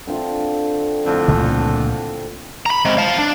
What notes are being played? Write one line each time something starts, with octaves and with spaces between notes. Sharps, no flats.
D3 C4 F4
F2 A2 D3 A4
C#2 A#2 A3
A#5 B5
G#3 C4
F5 A5
D4